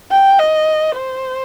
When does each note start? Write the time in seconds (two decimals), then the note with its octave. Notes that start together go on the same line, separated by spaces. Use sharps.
0.11 G5
0.39 D#5
0.95 C5